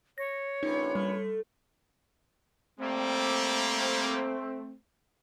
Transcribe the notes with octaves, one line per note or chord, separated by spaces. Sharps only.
C#5 A#6
A#1 C3 C#4 D#4 B4
G3 A3
G3 A3 A#3 C4